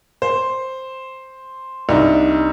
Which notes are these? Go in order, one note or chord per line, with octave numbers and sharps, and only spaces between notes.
C5
C2 D4 D#4